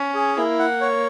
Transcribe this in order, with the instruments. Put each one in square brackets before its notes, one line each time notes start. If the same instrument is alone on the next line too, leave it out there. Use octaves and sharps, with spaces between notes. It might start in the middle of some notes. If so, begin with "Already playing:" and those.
Already playing: [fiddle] C#4
[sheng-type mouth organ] G#4
[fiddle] A#3 [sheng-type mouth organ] E4
[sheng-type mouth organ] F#5
C#5